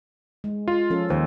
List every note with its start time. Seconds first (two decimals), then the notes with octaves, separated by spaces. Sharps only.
0.44 G#3
0.68 F4
0.90 F3 C#4 A4
1.10 D#2 C5